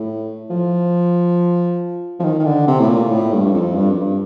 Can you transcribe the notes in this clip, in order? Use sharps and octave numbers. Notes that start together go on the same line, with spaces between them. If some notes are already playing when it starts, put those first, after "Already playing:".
Already playing: A2
F3
F3
D#3
D#3
D3
C3
A2
A#2
A2
G2
G2
F2
G2
F2
G2